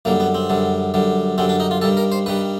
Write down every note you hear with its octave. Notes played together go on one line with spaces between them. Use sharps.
F#2 D3 G3 A#3
B3
C4
F#2 D3 G3
F#2 D3 G3
F#2 D3 G3 C4
D4
D#4
F4
G2 D#3 G3 A4
A#4
C5
G2 D#3 G3 B4